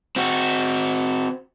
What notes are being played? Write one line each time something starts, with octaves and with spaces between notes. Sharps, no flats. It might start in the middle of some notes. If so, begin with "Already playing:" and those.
C4 F#4